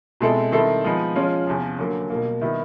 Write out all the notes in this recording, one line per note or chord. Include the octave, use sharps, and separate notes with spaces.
B2 G#3 C4 E4 A4
D#3 G3 C4 E4 A4
F3 G#3 B3 D#4
F3 G#3 C#4 F4
E2 C3 F3
D3 F#3 A#3
B2 G3 A#3
D#3 G3 B3 E4